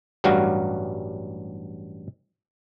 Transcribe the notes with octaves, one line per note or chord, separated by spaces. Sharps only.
A1 G2 F#3 G3 F#4 F5